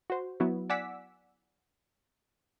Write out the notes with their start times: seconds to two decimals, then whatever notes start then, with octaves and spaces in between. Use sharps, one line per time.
0.10 F#4 C5
0.40 F#3 B3 E4 F#4
0.70 D5 F#5 G#5 D6 E6 B6